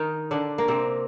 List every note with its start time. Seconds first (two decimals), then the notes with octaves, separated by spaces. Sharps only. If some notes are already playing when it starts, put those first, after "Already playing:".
Already playing: D#3 D#4
0.31 D3 D4
0.58 A#3
0.68 C3 C4